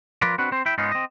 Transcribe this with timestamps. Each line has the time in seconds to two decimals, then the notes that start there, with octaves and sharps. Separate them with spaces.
0.22 F3 F4 A#4 B4 D5
0.38 C4 D4 F#4 B4
0.52 C4 C5
0.66 E4 E5 G5
0.78 G#2 G#3 B3 C#4 D#4 F4
0.92 C4 D#5